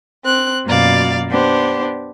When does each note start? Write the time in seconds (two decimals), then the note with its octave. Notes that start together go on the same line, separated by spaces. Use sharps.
0.24 C4 F#6
0.65 F#2 B2 A#3 F4 D5 F5
1.29 B3 D4 G4 C5